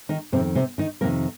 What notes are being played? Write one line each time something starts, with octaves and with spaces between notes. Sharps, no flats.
D#3 D#4
F2 C3 D#3 C4
C3 C4
D#3 D#4
F2 C3 D#3 A#3 A#4